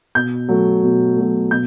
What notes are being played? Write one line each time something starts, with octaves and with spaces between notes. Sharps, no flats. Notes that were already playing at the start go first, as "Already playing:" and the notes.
B2 G6
F#3 A3
B2
F#3 A3
B2 G6